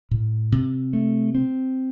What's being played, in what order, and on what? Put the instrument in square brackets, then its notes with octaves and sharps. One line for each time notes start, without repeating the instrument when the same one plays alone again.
[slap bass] A2
C3
A3
C4